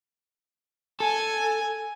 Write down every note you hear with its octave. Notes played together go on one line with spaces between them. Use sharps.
A4 G#5